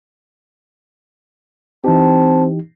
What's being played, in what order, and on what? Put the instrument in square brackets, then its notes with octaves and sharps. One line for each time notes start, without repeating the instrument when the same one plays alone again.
[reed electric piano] E3 D#4 G4 [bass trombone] C4 [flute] A5